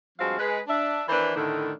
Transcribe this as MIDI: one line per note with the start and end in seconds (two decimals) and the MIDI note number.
0.19 0.36 43
0.19 0.36 53
0.19 0.36 56
0.19 0.36 60
0.19 0.36 66
0.19 0.36 77
0.38 0.59 56
0.38 0.59 71
0.67 1.03 62
0.67 1.03 76
1.08 1.34 51
1.08 1.34 52
1.08 1.34 62
1.08 1.34 64
1.08 1.34 71
1.08 1.34 72
1.35 1.70 45
1.35 1.70 50
1.35 1.70 51